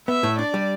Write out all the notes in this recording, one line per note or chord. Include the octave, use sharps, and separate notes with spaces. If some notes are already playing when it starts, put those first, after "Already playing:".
B3 E5
A2
D4 D5
G3